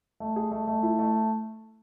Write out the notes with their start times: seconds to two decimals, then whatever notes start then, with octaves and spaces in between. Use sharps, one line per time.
0.20 A3
0.36 G#4
0.52 A3
0.67 A3
0.83 E4
0.99 A3